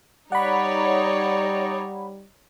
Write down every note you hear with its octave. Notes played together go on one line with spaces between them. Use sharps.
G3 D#4 C#5 D5 F#5 B5